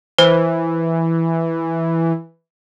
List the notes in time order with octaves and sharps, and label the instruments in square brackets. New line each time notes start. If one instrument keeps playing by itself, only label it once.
[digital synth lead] E3 [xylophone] C5